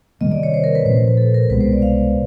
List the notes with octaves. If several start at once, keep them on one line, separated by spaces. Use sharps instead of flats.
C3 D#3 G3 A#3 D#5
D5
C#5
C5
A#4
B4
A#2 F3 A3 C#4 C5
C5
B4
A4
A#4
C2 B2 G#3 B4
C5
D5
F5